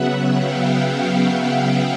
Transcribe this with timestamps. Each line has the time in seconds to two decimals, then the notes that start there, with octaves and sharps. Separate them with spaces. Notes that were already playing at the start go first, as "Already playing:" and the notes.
Already playing: C#3 F#3 B3 E5 F#5
0.29 F5 G5
0.64 F5 G5